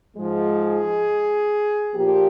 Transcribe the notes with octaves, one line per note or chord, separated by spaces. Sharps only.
G#2 F3 G#3
G#4
A#2 F3 A#3 G4